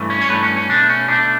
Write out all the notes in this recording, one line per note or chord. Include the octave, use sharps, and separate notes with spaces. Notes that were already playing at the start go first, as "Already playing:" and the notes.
Already playing: G2 E3 A3
C#4
C#5
G2 E3 A3 B4
C#4
C#4
B2 A3 D4
C#4
B2 A3 D4